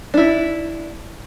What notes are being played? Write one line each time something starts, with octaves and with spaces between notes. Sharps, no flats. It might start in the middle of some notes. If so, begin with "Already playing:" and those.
D4 E4